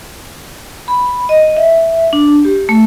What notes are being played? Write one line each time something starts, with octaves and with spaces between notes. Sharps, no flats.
B5
D#5
E5
D4
G4
A3